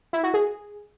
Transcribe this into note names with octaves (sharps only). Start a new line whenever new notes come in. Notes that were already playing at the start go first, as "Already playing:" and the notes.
E4
F#4
G#4